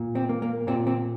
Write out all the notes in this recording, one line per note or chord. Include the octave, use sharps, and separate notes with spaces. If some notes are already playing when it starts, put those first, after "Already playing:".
Already playing: A#2
C4
A#3
A#3
A#2 C4
C4